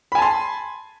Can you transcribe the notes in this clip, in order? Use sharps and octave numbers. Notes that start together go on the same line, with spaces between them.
G#5 A5 B5 C6